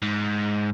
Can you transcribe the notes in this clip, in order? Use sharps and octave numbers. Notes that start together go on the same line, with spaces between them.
G#2